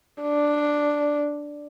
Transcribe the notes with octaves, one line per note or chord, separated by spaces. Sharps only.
D4